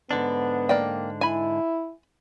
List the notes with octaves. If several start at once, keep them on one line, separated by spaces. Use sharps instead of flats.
G#2 D3 B3 D4
A#3 D5 G5
E4 G#5 B5